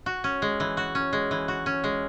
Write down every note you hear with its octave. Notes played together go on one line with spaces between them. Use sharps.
F#4
C#4
G#3
E3
F#4
C#4
G#3
E3
F#4
C#4
G#3